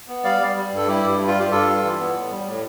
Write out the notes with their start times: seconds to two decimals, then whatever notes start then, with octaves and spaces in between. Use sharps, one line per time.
0.08 B3
0.24 G3 D5 F5
0.40 G3
0.56 G3
0.72 G2
0.77 A4
0.88 G3 E4 G4
1.04 G2
1.20 G3
1.27 F4
1.36 G2 G4
1.51 G2 F4 A4
1.67 G3
1.83 E3
1.99 B3
2.15 A2
2.31 G3
2.47 A2